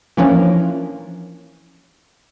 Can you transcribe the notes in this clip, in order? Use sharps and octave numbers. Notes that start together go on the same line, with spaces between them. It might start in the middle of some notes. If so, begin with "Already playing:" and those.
E3 F3 A#3 C#4 D4